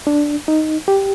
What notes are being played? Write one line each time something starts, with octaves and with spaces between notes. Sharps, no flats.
D4
D#4
G4